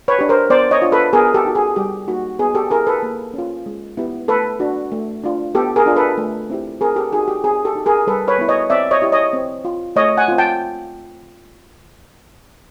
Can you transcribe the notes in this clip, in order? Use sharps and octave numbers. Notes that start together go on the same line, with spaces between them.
B4 C#5
D4 G4
A#4 C5
B3 C5 D5
C#5 D#5
D4 F4
A4 B4
B3 G#4 A#4
G4 A4
D#4 F#4
G#4
G3 G4
A#3 D#4 F#4
B3 G#4
G4 A4
E4 G4 G#4 A#4
A4 B4
A#3
C#4 F4
G#3
B3 E4 G4
A3 A4 B4
D4 F#4
A3
D4 F4
B3 G4 A4
G#4 A#4
D4 F4
A4 B4
A3
C4 E4 G4
C4 G#4 A#4
G4 A4
D#4 F#4 G#4
G4
C4 G#4
G4 A4
D#4 G4
G#4 A#4
G3 A4 B4
B4 C#5
B3 E4
C#5 D#5
C4 D5 E5
C#5 D#5
E4 G4
C#5 D#5
C4
F4
A3 C#5 D#5
F#5 G#5
C4 F4
G5 A5